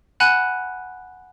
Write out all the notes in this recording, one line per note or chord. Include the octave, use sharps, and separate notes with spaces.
F#5 G#5 B5 F#6 D#7 E7